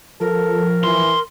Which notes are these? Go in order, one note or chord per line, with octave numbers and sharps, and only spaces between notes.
F3 A4 A#4
E3 C6